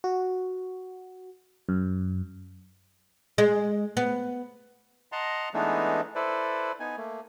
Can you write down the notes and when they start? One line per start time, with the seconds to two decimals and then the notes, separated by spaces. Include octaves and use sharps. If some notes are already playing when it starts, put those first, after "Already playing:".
0.04 F#4
1.69 F#2
3.38 G#3
3.97 B3
5.12 D#5 F#5 A5 A#5 C6
5.54 E3 G#3 A3 B3 D4 D#4
6.15 E4 A4 B4 C5 D5
6.80 B3 D#4 G#5
6.97 A3 A#3